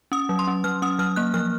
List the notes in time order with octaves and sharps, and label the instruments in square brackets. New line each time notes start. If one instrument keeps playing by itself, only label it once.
[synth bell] C#4 D#6
F#3
C6
C#4
F#3 F6
C#4 D#6
F#3 F6
A#3 F#6
F3 F6